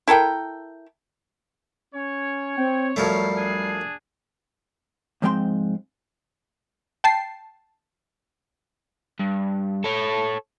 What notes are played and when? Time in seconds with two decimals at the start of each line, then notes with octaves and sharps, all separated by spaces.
0.08 E4 A4 A#4 G5
1.94 C#4 C#5
2.57 C4 G5
2.96 F#2 F3 G3 A3 C7
3.37 D4 G#4
5.22 G#2 F3 G#3 C4 G5 C6
7.04 G5 A5 C7
9.20 G2
9.84 A4 C#5